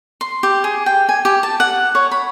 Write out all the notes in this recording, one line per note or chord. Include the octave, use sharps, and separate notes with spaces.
C6
G4
G#4
G5
G#5
G4
A5
F#5
C#5
B5